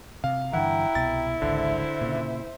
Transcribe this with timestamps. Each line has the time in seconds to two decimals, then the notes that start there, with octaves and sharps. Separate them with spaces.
0.24 C3 F5
0.53 G2 D3 E3 E4 F#5 G5 A#5
0.95 C2 B2 A6
1.42 G#1 C#2 D3 C5 E5
2.01 A#2 C#3